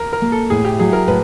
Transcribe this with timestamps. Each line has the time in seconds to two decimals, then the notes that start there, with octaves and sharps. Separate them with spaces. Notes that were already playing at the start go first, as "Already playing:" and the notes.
Already playing: A#4
0.13 A#4
0.22 A#3
0.32 A4
0.50 A2 G#4
0.65 G4
0.80 F#3 G#4
0.93 A#4
1.08 A2 B4